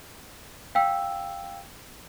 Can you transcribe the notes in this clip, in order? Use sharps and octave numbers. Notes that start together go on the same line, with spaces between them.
F5 G5 E6